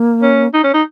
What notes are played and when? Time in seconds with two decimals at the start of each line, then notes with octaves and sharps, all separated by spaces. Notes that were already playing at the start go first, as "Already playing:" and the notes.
Already playing: A#3
0.22 C#4
0.53 D#4
0.64 C#4
0.74 D#4